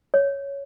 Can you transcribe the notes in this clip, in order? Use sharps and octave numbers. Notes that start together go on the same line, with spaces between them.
C#5